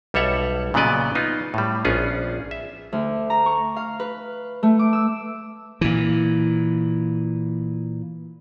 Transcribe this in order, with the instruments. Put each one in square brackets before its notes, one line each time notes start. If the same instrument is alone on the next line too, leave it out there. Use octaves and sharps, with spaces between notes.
[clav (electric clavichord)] B1 G3 A4 C#5 E5 F#5
A#2 C#3 F#3 B3 D5 D#5
B3 D#4 F4
A2 G3
A#1 B3 C#4 F4 G#4
E5
[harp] D2
A#5
C#6
F5
B4
A3
D6
E6
[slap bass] A#2 E3